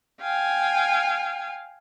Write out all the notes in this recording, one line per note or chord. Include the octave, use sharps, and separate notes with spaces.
F5 G5 G#5